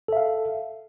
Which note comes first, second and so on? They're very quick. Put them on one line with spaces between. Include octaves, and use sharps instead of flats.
A4 E5 F5